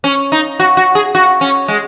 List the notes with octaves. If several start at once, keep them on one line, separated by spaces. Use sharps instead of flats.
C#4
D#4
F#4
F#4
G#4
F#4
C#4
G#3